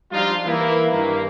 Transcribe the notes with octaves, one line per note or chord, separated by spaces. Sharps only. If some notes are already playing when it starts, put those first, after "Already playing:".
F3 G3 D4 D#4 F4
E3 A#3 E4
G2 D#3 A#3